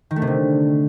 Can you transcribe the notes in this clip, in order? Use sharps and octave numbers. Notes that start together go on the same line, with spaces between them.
D#3
A3
C3
D3